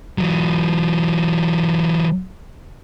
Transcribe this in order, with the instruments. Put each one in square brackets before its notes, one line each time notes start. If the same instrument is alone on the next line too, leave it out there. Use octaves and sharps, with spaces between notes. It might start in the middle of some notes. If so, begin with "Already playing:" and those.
[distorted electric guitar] E3 F#3